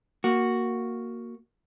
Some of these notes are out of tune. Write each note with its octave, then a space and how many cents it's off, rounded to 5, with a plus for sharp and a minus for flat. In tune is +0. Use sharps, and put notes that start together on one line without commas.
A#3 +0 F#4 +0